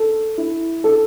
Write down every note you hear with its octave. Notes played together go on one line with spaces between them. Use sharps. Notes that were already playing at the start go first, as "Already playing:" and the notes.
Already playing: A4
E4
A4